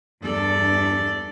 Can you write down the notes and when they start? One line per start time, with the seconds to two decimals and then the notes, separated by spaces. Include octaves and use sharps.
0.23 E2 G2 E3 D4 A4 D5